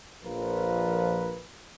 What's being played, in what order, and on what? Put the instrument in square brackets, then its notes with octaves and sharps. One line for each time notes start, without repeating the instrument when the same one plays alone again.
[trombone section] A#1 F3 F4 A#4 B4